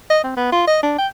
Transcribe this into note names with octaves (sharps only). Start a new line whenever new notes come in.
D#5
C4
B3
F4
D#5
D4
G5